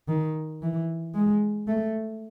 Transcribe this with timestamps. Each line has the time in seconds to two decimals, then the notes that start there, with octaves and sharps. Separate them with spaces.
0.08 D#3
0.62 E3
1.15 G#3
1.67 A3